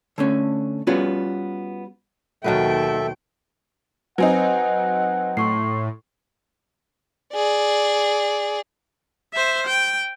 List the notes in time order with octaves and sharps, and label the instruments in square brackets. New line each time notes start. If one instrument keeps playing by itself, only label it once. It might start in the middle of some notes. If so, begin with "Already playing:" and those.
[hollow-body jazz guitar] D3 A3 C#4
G3 B3 C#4 F4 F#4
[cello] D#2 G5 [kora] B2 F#3 B3 [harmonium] A4 E5
[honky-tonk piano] F#3 C4 D#4 [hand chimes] B4 C5 G#5 [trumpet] F#5
[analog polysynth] A2 [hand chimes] C6 C#6 C7
[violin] G#4 D5
[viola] C5 E5
G5